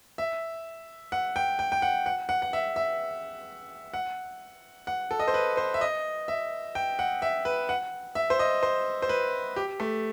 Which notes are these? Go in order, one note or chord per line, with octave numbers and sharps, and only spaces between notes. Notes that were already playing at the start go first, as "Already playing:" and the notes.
E5
F#5
G5
G5
G5
F#5
F#5
F#5
F#5
E5
E5
F#5
F#5
A4
D#5
C5
B4
C5
E5
D#5
E5
G5
F#5
E5
B4
F#5
E5
C5
D#5
C5
C5
B4
G4
A3